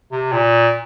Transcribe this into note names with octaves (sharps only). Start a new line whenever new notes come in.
C3
A#2